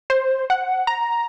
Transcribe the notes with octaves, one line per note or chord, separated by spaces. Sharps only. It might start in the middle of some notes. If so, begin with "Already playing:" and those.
C5
F#5
A#5